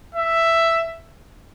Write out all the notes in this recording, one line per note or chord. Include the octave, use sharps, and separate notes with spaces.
E5